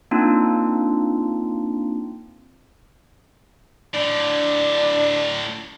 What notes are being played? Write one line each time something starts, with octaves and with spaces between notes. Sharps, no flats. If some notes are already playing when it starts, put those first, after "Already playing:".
A#3 C4 D4 D#4 F4
A2 D3 D4